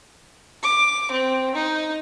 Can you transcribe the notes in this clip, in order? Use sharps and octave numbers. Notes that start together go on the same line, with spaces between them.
D6
C4
D#4